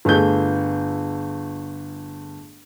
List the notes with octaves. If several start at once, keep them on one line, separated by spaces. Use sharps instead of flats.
G1 A3 G#4 G6